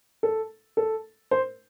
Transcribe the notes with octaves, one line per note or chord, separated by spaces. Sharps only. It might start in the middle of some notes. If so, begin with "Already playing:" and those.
A4
A4
C5